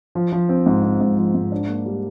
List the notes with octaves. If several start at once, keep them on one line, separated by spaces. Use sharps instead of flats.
F3
F3
C4
G#2
C4
G#2
F3
G#2
D4
A#3
G3